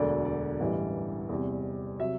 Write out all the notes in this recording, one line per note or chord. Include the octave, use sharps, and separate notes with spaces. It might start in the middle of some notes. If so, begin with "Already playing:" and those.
Already playing: E1 D2 D3 F#3 D5
D5
A1 G2 E3 G3
E2 C3 G3
C3 F#3 E5